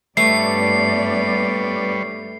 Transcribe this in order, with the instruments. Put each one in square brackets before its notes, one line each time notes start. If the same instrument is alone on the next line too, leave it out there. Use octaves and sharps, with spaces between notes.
[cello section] G2 B3 D5 [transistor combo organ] G3 B4 C#5 [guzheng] A3 [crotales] C7